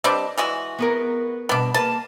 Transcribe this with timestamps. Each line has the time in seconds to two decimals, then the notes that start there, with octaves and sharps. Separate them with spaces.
0.04 G3 C4 D4 B4 D5 D#5
0.38 E3 G#3 F#4
0.79 B3 G#4 A#4
1.49 G2 B2 B3 D4
1.74 A#3 G#4 B4 A5